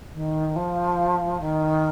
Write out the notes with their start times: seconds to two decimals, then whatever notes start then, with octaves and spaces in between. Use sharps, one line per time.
0.14 D#3
0.56 F3
1.40 D#3